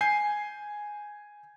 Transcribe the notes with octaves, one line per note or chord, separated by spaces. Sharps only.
G#5 G6 C7